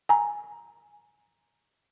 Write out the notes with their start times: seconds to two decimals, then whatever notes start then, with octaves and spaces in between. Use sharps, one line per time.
0.09 G#5 A#5